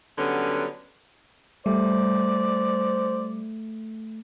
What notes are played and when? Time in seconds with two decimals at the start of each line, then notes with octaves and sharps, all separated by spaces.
0.18 D3 F#3 G3 B3 C#4
1.66 G3 A3 C5 D5